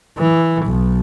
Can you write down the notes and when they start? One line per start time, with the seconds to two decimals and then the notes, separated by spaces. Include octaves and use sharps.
0.18 E3
0.66 B1